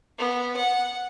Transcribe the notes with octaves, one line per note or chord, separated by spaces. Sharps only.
B3
F#5